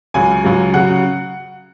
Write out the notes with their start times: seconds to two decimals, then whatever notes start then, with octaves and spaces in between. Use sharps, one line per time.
0.14 C#2 C#3 F#3 G#5
0.45 C#2 C#3 F#3
0.74 C#3 F#3 F#5